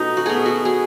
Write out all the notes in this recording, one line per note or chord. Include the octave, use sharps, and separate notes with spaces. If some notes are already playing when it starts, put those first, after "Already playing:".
Already playing: B2 A3 C#4 D#4
F#4
B2 A3 G#4
F#4
G#4